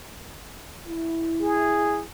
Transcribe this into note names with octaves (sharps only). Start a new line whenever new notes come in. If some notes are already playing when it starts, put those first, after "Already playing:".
E4
G#4